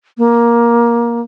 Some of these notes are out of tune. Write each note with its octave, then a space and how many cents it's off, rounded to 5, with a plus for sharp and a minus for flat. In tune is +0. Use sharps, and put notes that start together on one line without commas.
A#3 +15